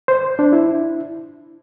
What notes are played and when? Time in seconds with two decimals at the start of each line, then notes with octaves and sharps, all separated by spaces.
0.08 C5
0.39 D4
0.53 E4